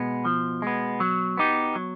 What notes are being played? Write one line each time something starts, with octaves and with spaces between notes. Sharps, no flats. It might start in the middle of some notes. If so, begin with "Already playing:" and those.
Already playing: B2 G#3 B3
F3
G#3 B3
F#3
B3 D#4 G4
F#3